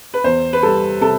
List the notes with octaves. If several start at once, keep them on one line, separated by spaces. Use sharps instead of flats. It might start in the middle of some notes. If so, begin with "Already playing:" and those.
B4
E2 C5
B4
G3 A4
C3 A4